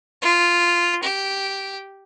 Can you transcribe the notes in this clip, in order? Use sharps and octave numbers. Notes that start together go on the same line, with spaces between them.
F4
G4